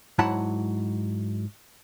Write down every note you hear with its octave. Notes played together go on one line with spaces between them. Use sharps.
G#2 F#3 E4 F#5 A5 B5